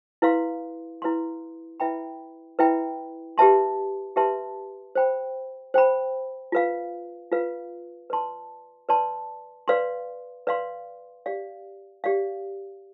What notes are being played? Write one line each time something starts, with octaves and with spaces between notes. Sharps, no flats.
E4 B4 F5 C6
E4 B4 F5 C6
E4 B4 E5 G5 B5
E4 B4 E5 G5 B5
G4 B4 E5 A5 C6
G4 B4 E5 A5 C6
C5 G5 B5
C5 G5 B5
F4 B4 F5
F4 B4 F5
B4 D5 A5 C6
B4 D5 A5 C6
B4 D5 F5 C6
B4 D5 F5 C6
G4 D5 F5
G4 D5 F5